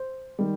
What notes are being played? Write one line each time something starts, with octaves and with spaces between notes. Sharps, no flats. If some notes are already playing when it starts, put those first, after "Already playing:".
Already playing: C5
D#3 G3